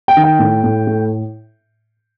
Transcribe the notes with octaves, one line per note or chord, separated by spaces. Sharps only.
G5
D#3
G5
A2
A2
A3